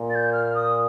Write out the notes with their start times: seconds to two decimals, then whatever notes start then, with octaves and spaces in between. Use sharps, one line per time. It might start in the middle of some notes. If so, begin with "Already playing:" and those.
Already playing: A#2
0.10 A6
0.15 G6
0.33 F6
0.55 D#6